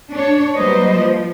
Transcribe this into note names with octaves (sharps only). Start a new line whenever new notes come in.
D4 C#5
F#3 G3 A#3 B4 C5 D#5
F3